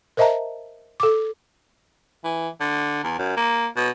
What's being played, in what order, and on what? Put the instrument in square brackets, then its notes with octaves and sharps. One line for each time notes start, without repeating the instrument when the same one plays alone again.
[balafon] A#4 C5 D#5 E5 A5 A#5
A4 D6
[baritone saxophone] E3
D3
E2
F#2
A#3
B2